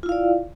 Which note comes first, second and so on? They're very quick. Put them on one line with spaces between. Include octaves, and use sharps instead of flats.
F4 E4 F5 D5